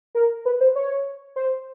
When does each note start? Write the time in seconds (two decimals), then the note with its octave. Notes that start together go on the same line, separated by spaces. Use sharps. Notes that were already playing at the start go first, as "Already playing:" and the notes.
0.15 A#4
0.45 B4
0.61 C5
0.76 C#5
1.36 C5